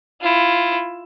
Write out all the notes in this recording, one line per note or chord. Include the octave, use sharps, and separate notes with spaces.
E4 F4